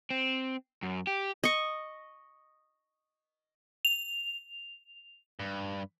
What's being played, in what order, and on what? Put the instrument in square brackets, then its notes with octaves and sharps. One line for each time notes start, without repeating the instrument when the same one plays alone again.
[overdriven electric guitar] C4
F#2
G4
[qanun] D#5 C#6
[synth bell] F7
[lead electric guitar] G2